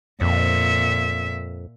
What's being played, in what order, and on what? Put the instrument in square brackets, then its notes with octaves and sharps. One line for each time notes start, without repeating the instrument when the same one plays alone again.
[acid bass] F2 [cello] A#2 E5